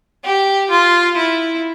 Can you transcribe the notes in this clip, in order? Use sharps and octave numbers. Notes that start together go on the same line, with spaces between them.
G4
F4
E4